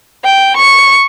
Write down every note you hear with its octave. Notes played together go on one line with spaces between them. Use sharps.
G5
C#6